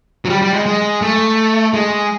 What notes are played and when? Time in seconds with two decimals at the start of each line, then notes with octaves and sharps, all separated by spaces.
0.25 F#3
0.29 G3
0.42 G3
0.54 G#3
0.66 G#3
1.02 A3
1.74 G#3